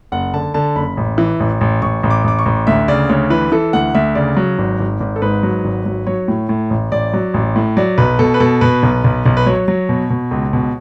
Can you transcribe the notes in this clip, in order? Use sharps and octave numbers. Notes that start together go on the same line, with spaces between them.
F#1 F#5
D3 A5
D3 A5
F#1 B5
A1
E3
A1
A1
A1 C#6
A1
D6
A1 D6
C#6
A1
D2 E5
C#3 D5
D2 C#5
E3 B4
E3 A4
D2 F#5
D2 E5
C#3 D5
F#3
G#1
G#1
G#1
A4
G#2 B4
F#3
G#1
F#3
F#3 C#5
A2
A2
A1
A1 D5
F#3
A1
A2
F#3 D5
B1 B4
B2 A4
B4
B2 A4
B2 B4
B1
B1
B1
B4
F#3 C#5
F#3
B2
B2
C#2
B2